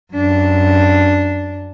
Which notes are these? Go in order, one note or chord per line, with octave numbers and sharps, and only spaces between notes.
F#2 D4